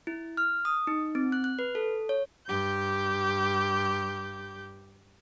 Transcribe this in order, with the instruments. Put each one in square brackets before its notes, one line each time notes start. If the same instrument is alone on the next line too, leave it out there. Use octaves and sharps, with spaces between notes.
[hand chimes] E4
F6
D#6
D#4
C4
F#6
F#6
B4
A4
C#5
[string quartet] G2 G4 G6